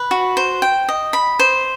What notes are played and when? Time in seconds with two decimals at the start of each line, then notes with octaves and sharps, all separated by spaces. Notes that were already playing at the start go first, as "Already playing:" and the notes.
Already playing: B4
0.11 F#4
0.37 C5
0.62 G5
0.89 D#5
1.13 B5
1.39 C5